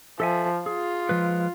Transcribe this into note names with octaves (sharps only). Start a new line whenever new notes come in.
F3 A4 E5 G#5
F4 G#4
F3 G#3 B4